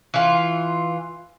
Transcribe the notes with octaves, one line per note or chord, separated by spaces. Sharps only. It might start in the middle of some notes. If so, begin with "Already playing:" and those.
E3 F4